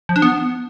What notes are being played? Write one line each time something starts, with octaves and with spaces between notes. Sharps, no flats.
F3
D4
B3